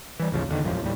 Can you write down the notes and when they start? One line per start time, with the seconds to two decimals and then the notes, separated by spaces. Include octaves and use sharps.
0.19 E3 G3
0.32 A1 D#2 C#3 F3
0.49 E2 D3 D#3
0.64 E1 A1 F#2 F3
0.81 D#2 A2 G3